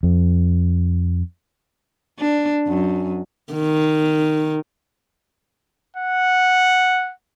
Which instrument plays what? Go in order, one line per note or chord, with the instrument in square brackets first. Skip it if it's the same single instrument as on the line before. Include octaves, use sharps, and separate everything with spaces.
[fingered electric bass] F2
[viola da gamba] D4
F#2
D#3
[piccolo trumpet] F#5